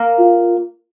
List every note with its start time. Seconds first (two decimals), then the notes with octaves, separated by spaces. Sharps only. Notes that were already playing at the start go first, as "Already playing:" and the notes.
Already playing: A#3 A#4
0.19 F4